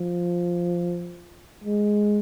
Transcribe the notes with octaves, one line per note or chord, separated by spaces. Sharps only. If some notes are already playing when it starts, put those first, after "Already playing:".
Already playing: F3
G#3